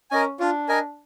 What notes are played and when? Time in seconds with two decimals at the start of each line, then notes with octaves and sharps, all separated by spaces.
0.11 C#4 A#4 D#5 G#5
0.40 D4 F4
0.69 A#4 D#5 G#5